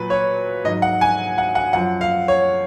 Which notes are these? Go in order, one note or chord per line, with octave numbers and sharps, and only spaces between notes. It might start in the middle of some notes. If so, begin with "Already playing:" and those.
Already playing: A#2 F#3 B4
C#5
G#2 F#3 D#5
F#5
G#5
F#5
F#5
F#2 F3 F#5
F5
C#5